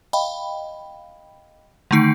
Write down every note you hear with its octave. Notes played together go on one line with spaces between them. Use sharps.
D#5 F5 G5 B5
D3 D#3 A3 D#4 C7 D7